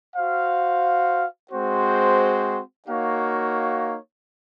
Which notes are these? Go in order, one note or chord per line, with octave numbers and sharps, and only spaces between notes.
F#4 C5 F5
G#3 C4 F#4 C5
A#3 D#4 F#4 C#5 F5